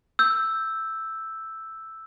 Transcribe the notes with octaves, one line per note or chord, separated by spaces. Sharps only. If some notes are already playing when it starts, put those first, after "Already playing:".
E6 G6